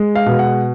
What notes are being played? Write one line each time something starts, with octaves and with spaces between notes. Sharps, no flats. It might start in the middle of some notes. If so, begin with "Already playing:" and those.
Already playing: G#3
F5
B2
F#5